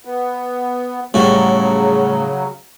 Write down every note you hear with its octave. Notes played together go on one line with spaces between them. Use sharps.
B3
A2 C#3 F#3 G3 F#4 D5